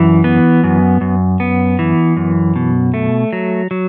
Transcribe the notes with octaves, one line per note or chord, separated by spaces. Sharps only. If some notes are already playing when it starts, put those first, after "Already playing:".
Already playing: F#2 E3
B3
F#2
F#2
B3
E3
F#2
B2
A3
F#3
F#3